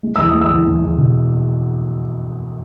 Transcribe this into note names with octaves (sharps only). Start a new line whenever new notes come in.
G#3
E2 E6
D#6
G#3
E6
E2
E2
E2
B2